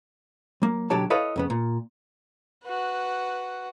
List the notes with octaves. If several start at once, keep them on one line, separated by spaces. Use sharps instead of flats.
F#3 A#3
B1 D3 F#3 G4 C#5 A5
E4 A4 B4 C#5 D#5 F5
F2 C#3 B3
A#2
F#4 B4